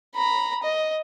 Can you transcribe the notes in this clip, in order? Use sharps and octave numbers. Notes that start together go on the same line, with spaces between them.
A#5 B5
D#5